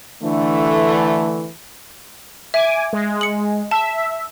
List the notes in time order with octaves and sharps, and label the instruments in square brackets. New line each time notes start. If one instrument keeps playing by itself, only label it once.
[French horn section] D3 E3 A3
[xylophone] E5 [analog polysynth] G#5 D6
[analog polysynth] G#3
[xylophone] C#7 F#7
[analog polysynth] E5 [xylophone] A5